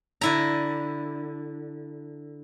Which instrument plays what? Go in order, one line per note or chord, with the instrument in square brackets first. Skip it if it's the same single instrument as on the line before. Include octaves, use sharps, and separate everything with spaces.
[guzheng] D3 E4 A#5